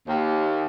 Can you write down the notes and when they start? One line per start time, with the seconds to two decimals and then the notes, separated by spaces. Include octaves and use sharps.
0.07 D#2